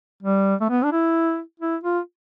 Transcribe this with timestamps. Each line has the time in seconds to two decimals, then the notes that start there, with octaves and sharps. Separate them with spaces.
0.23 G3
0.61 A3
0.70 B3
0.83 D4
0.92 E4
1.60 E4
1.84 F4